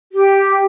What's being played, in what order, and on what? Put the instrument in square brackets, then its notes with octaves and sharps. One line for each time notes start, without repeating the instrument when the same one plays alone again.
[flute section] G4